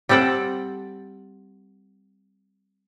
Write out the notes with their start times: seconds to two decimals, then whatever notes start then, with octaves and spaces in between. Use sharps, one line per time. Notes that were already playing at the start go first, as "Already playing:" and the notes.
0.09 G3 C4 A4 F#5 G5